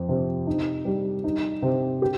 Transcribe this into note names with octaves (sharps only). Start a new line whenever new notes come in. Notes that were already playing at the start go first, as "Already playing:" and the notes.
Already playing: F2 C4
C3
D#4
G3
D#4
C3
G4